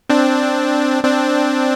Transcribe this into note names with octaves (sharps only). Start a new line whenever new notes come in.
C4 D4
C4 D4